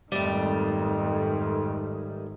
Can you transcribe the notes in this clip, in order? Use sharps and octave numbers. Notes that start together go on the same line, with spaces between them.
F2 G#2 D#3 G3 A3